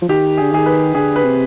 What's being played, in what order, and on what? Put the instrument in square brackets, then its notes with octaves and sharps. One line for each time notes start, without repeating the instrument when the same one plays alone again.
[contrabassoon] F3
[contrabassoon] D#3 [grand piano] G4
[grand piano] G#4
[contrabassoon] D3
[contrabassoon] D#3 [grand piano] G#4
[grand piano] B4
[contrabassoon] D3 [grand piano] G#4
[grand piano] B4
[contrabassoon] C3